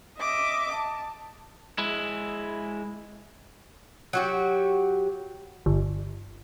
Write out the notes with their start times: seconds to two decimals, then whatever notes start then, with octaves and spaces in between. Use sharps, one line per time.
0.18 D#5 E5 D6
0.72 A5
1.78 G#3 E4
4.13 F#3 F#4 G4
5.66 G1